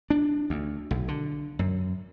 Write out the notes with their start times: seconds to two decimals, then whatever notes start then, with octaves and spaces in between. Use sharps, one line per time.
0.10 D4
0.50 D2
0.91 B1
1.08 D3
1.59 F#2